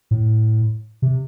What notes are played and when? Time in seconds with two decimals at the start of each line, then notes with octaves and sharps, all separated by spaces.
0.11 A2
1.02 C3